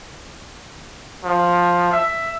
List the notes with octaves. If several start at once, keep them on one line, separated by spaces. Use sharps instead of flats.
F3
E5